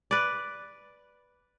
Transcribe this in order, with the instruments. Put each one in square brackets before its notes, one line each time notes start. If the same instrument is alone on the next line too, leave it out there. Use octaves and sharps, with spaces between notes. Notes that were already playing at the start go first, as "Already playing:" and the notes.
[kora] B4 D5